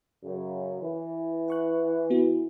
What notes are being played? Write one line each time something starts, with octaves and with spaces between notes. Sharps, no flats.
F#2 C#3
E3
F#5 C#6 F#6
B3 E4 F#4